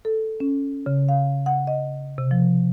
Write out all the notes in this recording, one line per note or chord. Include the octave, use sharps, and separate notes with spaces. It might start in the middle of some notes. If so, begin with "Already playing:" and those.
A4
C#4
C#3
F5
F#5
D#5
C3
F3